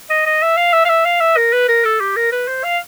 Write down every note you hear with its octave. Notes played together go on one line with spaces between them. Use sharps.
D#5
D#5
E5
F5
E5
F5
E5
F5
E5
A#4
B4
A#4
A4
G4
A#4
B4
C5
F5